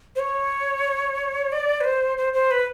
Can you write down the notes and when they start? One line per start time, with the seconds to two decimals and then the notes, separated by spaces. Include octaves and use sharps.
0.16 C5
0.19 C#5
1.52 D5
1.81 B4
1.84 C5
2.18 C5
2.33 C5
2.51 B4